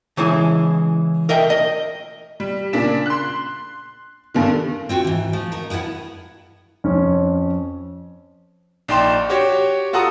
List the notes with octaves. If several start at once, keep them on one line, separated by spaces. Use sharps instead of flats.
C#3 E3 G#3 E4
A#4 D#5 E5 G5
D#5
G3
A#2 C#3 D4 B6 E7
C6 F#6
G2 D3 D#3
C4 F4 F#4 G5
G#2 E3
F3 A3
D#4 A#4
F3 G#3 B3 E4 F#5
F2 C#4
A#1 D#4 D5 G5 C6 E7
F#4 G4 C#5
F4 F#4 A4 F#5 A#5 D#6